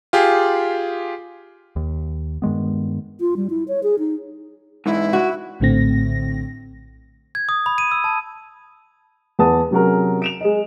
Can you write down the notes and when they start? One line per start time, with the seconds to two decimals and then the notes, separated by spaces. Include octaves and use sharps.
0.13 F4 G4 G#4
1.76 D#2
2.42 G2 D#3 G#3 B3
3.20 F4
3.37 G3
3.50 E4
3.68 C#5
3.83 G#4
3.99 D#4
4.86 G#2 E3 E4
5.13 F#4
5.60 A#1 A2 D3 A3 C4 A#6
7.35 G#6
7.49 D#6
7.66 B5
7.78 D#7
7.91 E6
8.04 A5
9.39 E2 B4 F#5 A5 D#6
9.71 C3 F#3 C#4 F#4 G#4 A#4
10.22 D7 E7 F7
10.41 G#3 D#5